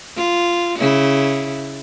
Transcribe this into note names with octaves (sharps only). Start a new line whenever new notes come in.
F4
C#3 E4